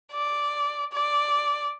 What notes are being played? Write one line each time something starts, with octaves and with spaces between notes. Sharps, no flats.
D5
D5